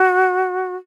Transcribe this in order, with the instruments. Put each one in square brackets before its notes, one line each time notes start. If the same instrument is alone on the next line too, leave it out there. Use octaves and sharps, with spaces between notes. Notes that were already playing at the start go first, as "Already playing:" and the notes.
Already playing: [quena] F#4